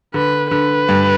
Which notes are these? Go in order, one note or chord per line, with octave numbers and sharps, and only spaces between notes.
D3 B4
D3 B4
G2